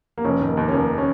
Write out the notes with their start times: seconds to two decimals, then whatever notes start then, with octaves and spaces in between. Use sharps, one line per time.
0.18 A#3
0.24 F1 C#4
0.41 D#3
0.49 A#3
0.57 D#2
0.68 C#4
0.73 F1 A#3
0.98 C#4